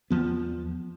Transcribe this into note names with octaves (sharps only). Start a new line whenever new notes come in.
E2 F3 B3